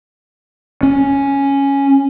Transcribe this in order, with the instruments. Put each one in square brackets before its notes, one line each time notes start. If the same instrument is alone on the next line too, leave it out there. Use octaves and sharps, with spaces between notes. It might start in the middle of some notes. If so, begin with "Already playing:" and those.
[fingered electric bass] C#4